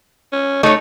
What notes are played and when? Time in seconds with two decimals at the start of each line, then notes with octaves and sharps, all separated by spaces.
0.33 C#4
0.63 A3 D#4 C#5